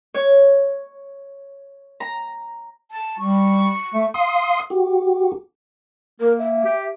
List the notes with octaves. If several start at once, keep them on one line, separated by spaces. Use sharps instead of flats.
C#5
A#5
A5
G3 C#6
A3
F5 C6 D#6
F#4 G4
A#3 A#4
E5
G4